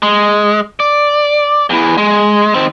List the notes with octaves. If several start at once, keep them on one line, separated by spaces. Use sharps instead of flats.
G#3
D5
E2 E3
G#3
D#3 C4